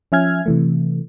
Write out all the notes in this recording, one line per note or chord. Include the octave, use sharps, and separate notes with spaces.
F3 C#4 E5 G#5 F6 G#6
C3 E3 A3